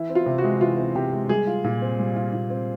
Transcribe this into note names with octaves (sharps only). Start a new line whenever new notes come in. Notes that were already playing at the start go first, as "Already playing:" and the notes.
Already playing: E3 E4
C4
F4
C3
F#4
G#3
E3 F4
C4
C3 G4
G#3
G3 G#4
F4
A#2
C4
G3
F4
A#2
C4